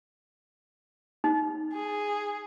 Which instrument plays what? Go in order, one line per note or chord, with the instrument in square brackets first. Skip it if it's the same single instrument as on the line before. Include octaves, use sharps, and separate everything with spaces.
[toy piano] D#4
[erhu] G#4